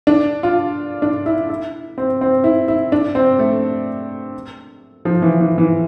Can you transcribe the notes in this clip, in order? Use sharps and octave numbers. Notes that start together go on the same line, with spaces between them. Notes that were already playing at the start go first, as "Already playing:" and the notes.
D4
F4
D4
E4
E4
C4
C4
E4
E4
D4
C4
A3
F3
E3
E3
E3